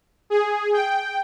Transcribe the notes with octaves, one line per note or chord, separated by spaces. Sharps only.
G#4
G5